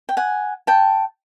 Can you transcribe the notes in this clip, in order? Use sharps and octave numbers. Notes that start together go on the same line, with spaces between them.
G5
F#5 G#5
G5 A5